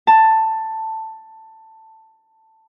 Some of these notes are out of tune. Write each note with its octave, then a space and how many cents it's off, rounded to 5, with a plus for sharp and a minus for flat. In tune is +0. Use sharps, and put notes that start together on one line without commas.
A5 +10